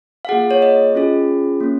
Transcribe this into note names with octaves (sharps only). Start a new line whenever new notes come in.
F5
A#3 F4 G#4 F#5
C#5
D#5
C#4 F4 G#4
A#3 C#4